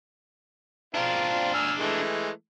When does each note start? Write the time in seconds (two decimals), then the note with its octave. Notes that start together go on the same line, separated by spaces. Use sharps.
0.94 C4 D4 F4 A#4
1.54 G#5 E6 F6
1.79 E3 G#3 A3